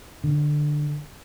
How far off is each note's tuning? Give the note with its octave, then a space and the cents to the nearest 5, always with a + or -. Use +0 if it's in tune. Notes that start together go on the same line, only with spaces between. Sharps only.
D3 +15